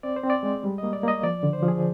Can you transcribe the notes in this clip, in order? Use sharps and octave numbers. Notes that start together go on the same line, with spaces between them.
C4 D5
C5
C4
D5
G#3
G3
A#3 D#5
D5
A#3 D#5
F3 D5
D3
C5
F3
G#4